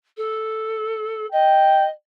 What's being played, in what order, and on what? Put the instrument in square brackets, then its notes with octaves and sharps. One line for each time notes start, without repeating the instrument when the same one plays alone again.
[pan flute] A4
[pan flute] D#5 [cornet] G5